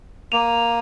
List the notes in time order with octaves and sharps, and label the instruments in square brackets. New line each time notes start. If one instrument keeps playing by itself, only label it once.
[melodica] A#3 [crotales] D#7 F7